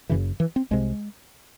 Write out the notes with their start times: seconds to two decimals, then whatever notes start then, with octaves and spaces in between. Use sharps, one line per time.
0.09 F#1 F#2 C#3 E3
0.40 E3
0.56 C4
0.71 C2 C3 G#3